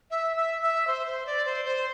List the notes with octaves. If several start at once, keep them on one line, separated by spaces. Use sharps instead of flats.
E5
E5
E5
C5
C5
D5
C5
C5